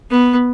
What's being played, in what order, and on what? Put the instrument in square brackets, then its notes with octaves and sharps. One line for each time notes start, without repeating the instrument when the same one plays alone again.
[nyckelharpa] B3